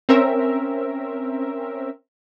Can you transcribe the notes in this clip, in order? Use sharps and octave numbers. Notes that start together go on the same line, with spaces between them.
C4 C#4 A#4 E5